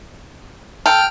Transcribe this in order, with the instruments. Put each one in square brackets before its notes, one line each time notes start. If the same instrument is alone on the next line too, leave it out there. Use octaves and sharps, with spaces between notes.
[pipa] A4 [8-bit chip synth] G5 F6